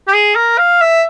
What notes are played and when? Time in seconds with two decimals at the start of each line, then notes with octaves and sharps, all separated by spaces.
0.08 G4
0.14 G#4
0.36 A#4
0.58 F5
0.81 E5